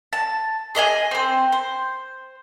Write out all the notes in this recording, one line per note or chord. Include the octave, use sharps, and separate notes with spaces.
A5
G#4 D#5 E5 G#5
C4 C5
C5